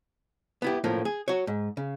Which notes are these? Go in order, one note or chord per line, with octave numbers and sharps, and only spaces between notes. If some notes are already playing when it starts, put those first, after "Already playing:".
B3 E4 G4
A2 F3 A#3
G#4
F#4 C#5
G#2
C#3